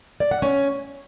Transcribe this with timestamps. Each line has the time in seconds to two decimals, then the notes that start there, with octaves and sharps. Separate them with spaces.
0.20 D5
0.31 F#5
0.42 C#4